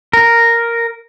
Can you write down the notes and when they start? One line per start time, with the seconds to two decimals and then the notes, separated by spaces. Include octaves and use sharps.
0.13 A#4